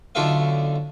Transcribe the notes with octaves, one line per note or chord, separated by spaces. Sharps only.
B1 D3 F4 A4 E5 F5